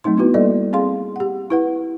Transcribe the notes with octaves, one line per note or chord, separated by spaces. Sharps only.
F#3 A3 C4 D#4 C6
B3 D#4 E4 F#4 B4
G3 A#3 A4 D5 D#5
C4 G#4 F5 C6
G4 F#5
E4 B4 F#5